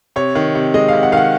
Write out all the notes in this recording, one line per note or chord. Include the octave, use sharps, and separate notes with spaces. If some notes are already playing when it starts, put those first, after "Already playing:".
C3 C#5
D#3
C3
G#3 D#5
F5
C3
F#5
D#3 F5
F#5